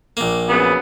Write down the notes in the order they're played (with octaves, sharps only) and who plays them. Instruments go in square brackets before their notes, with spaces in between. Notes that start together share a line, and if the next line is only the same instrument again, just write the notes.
[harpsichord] A#1 A#3
[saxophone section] C#3 F#3 B3